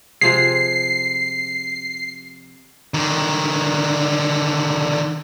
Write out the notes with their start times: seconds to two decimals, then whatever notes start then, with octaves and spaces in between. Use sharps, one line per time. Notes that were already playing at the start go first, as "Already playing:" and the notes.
0.21 C3 F3 G#4 C7
2.94 D3 D#3